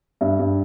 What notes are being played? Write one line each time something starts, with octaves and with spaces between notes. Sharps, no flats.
G2 E5
G2